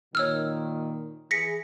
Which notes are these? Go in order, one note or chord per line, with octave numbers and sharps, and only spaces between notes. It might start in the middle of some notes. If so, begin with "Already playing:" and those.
A#2 D#3 C#5 E6 F6
E3 G#4 A#6 B6 C#7